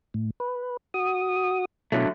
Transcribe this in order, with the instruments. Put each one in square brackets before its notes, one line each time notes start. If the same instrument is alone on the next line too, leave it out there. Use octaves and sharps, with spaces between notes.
[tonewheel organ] A2
B4
F#4 D#6
[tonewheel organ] B2 [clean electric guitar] D3 F#3 A3